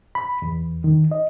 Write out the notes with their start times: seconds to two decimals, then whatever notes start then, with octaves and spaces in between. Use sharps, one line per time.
0.15 B5
0.42 E2
0.84 D#3
1.11 D#5